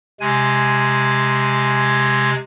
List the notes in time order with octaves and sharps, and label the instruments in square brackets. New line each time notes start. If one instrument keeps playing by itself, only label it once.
[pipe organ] C3 G#3 G#5 G#6